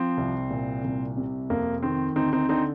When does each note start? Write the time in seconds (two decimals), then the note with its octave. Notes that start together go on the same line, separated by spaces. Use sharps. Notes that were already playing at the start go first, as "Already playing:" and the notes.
Already playing: F3 C4
0.17 C2
0.50 A#2
0.84 C2
1.17 C3
1.50 F2 A#3
1.82 D#3 C4
2.16 D2 C4 D#4
2.33 C4 D#4
2.49 D3 C4 D#4